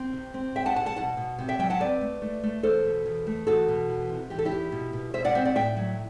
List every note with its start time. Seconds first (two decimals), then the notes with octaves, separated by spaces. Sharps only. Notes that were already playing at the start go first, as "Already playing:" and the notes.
Already playing: C4
0.13 C3
0.34 C4
0.56 G3 E5 G5
0.66 F#5 A5
0.76 B2 F#5 A5
0.86 F#5 A5
0.96 B2 F#5 A5
1.17 B2
1.38 C3
1.49 E5 G5
1.59 F#3 E5 G5
1.70 F#5 A5
1.80 C4 B4 D5
2.01 A3
2.22 A3
2.43 A3
2.63 E2 A4 C5
2.84 B2
3.06 E2
3.27 A3
3.47 E2 F#4 A4
3.68 B2
3.90 E3
4.09 C3
4.30 E3 G4
4.39 A4
4.45 E4 G4
4.52 E2
4.72 B2
4.93 B2
5.14 B2 C5 E5
5.25 D5 F#5
5.35 C4 C5 E5
5.45 D5 F#5
5.55 A2 E5 G5
5.77 F#3